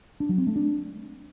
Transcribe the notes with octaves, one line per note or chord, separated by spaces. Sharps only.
D4
F#3
C4
A3
D4